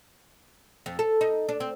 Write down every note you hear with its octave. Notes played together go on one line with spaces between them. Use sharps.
F2
A4
D#4
D4
C4